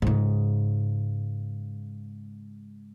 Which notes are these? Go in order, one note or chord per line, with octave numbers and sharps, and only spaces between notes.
G#2 C#3